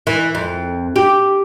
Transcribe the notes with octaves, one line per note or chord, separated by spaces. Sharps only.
E3
F2
G4